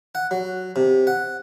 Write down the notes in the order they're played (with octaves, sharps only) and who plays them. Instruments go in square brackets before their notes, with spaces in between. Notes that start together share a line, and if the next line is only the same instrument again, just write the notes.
[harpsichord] F#5
F#3
C3
F#5